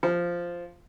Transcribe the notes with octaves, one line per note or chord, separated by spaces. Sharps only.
F3